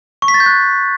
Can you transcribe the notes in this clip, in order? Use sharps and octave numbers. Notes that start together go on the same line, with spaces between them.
C#6
B6
A6
G6
F#6